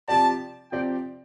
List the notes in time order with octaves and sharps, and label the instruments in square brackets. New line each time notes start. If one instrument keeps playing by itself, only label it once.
[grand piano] C3 F3 C4 G4 D5 [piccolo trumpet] A5
[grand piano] C3 F3 C4 G4 D5 [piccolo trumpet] G5